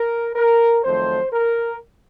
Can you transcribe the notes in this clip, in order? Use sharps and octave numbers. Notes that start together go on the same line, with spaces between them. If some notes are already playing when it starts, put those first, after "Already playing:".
Already playing: A#4
A#4
F2 D#3 F#3 A3 C5
A#4